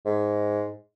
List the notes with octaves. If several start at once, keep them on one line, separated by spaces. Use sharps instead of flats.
G#2